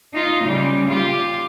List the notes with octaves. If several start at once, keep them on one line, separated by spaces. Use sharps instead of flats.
D#4 F4
C#3 G3
F4 G4